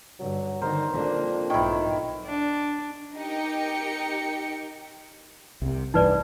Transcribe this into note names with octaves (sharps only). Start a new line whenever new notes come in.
G2 D3 F#3
D3 D#3 A#4 C5
F2 A#3 D4
B1 G#2 D#3 E4
D4
D#4 G4 A#4 G5 C#7
C2 C3
C2 G2 E3 D#4 B4 D5